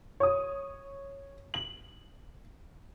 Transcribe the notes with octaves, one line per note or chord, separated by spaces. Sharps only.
C#5 D#6
F#7